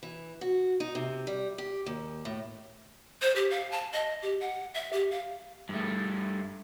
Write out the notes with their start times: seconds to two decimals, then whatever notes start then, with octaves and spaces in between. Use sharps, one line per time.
0.03 E3
0.41 F#4
0.80 D#4
0.95 C3
1.27 G3
1.58 G4
1.86 D#2
2.25 A2
3.22 C5
3.36 G4
3.51 F5
3.72 A5
3.93 D#5
4.23 G4
4.41 F#5
4.74 E5
4.93 G4
5.11 F5
5.69 G2 A3